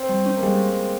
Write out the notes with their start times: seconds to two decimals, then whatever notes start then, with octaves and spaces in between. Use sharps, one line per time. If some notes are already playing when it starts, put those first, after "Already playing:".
Already playing: C4
0.09 G3
0.26 C#4
0.37 A#3
0.43 G3 G#3